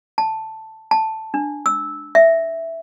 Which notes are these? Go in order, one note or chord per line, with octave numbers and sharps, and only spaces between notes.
A5
A5
D4
E6
E5